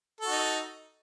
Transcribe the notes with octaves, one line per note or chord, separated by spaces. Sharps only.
D#4 F#4 A4